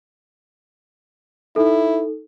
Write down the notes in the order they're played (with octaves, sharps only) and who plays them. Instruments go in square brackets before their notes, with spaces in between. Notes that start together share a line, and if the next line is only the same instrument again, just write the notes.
[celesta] D#4 A4 [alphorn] E4